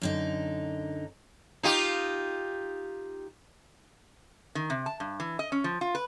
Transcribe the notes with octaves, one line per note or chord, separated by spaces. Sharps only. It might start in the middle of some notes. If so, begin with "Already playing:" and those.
F#2 D3 D#4
D#4 F4 G4
D#3
C3
A5
G2
E3
D#5
C#4
F3
F4
B4